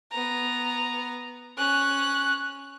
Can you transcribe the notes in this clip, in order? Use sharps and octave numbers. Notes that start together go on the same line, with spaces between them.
B3 A#5
C#4 F#6